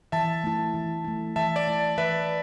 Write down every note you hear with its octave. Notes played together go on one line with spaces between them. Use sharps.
E3 E5 A5
A3 E4
E3
A3 E4
E3 E5 A5
D5
A3 E4
E3 B4 E5